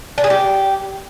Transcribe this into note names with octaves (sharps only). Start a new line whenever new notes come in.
D4
G#4
G4